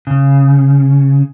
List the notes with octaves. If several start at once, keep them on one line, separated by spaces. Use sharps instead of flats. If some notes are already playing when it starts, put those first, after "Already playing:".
C#3